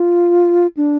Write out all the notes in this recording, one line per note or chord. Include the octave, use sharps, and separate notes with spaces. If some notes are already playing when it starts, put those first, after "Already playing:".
Already playing: F4
D4